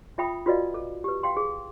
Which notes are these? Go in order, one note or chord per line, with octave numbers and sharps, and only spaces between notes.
F4 E5 G5 B5 D#6
F4 F#4 B4 D5 D#5 F5
A4
G4 B4
F5 G5 C6
G#4